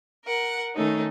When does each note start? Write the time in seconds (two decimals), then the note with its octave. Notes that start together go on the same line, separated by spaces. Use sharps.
0.25 A#4 F#5
0.76 D#3 A3 C#4 D#4